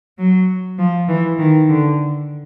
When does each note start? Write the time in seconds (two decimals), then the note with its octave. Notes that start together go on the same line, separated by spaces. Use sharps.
0.18 F#3
0.79 F3
1.09 E3
1.39 D#3
1.69 D3